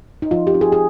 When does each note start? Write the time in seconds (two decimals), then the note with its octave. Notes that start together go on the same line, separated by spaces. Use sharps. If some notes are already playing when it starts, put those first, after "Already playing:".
0.22 D#4
0.31 F3 F4
0.47 G4
0.54 C4 D#4
0.61 G#4
0.72 G#4